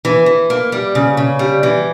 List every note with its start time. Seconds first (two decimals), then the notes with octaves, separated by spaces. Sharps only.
0.05 E3
0.26 E3
0.50 A#3
0.72 G3
0.95 C#3
1.17 C#3
1.39 G3
1.63 E3